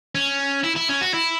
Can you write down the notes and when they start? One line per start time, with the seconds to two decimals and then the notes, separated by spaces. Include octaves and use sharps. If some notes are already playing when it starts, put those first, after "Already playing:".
0.15 C#4
0.64 E4
0.76 E4
0.89 C#4
1.01 F#4
1.14 E4